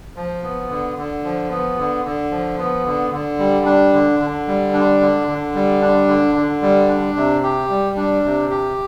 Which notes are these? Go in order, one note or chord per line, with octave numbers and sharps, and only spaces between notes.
F3
B3
D3
D3
F3
B3
D3
D3
F3
B3
D3
D3
G3
D4
D3
D3
G3
D4
D3
D3
G3
D4
D3
D3
G3
D4
C3
G4
G3
D4
C3
G4